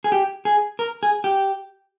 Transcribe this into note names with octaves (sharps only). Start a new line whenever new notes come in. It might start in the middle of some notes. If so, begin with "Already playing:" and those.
G#4
G4
G#4
A#4
G#4
G4